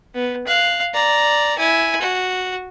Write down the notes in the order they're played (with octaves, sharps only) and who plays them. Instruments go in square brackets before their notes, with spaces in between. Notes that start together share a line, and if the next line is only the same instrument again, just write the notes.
[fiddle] B3
F5 F#6
D5 A#5
E4 G#5
F#4